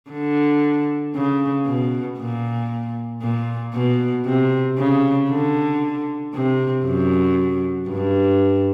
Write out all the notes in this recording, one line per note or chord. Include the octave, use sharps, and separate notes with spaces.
D3
C#3
B2
A#2
A#2
B2
C3
C#3
D3
C3
F#2
G2